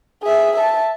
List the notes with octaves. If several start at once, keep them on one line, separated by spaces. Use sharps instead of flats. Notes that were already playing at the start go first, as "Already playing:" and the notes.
G#4 E5
E5 A5